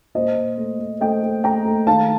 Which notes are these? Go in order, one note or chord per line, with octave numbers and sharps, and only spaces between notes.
A#2 C5 D#5
A#2
A3
A3
A3 D#5 G5
A3
A3 G5 A#5
A3
D#3 F5 A5